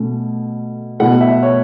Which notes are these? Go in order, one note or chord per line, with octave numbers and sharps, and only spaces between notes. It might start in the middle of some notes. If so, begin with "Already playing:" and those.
Already playing: B2 A3 C#4
B2 A3 E4 F#5
E5
C#5